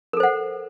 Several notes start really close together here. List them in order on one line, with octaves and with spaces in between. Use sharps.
A#4 A4 C5 F#5